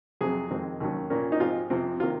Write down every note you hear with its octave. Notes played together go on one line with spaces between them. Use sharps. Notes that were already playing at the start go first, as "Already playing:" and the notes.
F2 C3 F#3 C4 G#4
F2 D#3 G#3 C4
D#2 D#3 F#3 C#4
A#2 F3 A#3 C#4
D#4
G#2 F3 C4 F4
F2 C3 F3 C4
C3 D#3 A#3 F4